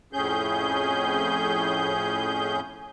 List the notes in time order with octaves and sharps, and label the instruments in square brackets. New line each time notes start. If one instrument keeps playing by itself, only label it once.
[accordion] F2 A2 C#4 G#4 G6